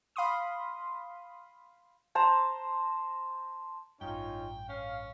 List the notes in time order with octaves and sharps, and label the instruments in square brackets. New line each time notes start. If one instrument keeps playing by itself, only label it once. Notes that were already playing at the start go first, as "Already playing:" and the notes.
[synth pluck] F5 B5 C6 D#6
[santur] C5 A5 A#5
[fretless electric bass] A1 G2 [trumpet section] C#4 D#4 F4 [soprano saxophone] G5
[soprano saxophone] C#4 [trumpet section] F5